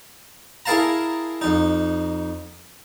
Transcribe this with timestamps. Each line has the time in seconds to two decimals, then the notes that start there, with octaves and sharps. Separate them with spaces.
0.66 E4 G#4 A#4 F5 A5 A#5
1.41 F2 D#4